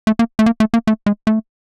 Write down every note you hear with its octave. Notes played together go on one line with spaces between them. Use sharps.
A3
A#3
A3
A#3
A3
A#3
A3
G#3
A3